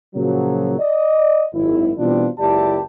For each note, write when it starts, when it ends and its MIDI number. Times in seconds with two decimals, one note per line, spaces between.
0.14 0.74 46
0.14 0.74 49
0.14 0.74 53
0.14 0.74 54
0.80 1.44 74
0.80 1.44 75
1.54 1.91 32
1.54 1.91 42
1.54 1.91 64
1.98 2.27 47
1.98 2.27 52
1.98 2.27 55
1.98 2.27 60
1.98 2.27 62
1.98 2.27 65
2.39 2.79 30
2.39 2.79 37
2.39 2.79 64
2.39 2.79 67
2.39 2.79 74
2.39 2.79 81